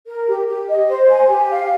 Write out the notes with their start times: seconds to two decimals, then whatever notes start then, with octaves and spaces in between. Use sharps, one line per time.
0.06 A#4
0.27 G4
0.47 G4
0.69 D#5
0.89 C5
1.09 G#5
1.29 G4
1.50 F5